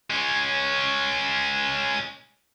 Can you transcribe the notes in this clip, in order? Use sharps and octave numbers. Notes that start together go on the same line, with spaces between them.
G#3 C#4